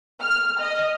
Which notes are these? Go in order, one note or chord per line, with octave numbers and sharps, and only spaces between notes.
F6
D#5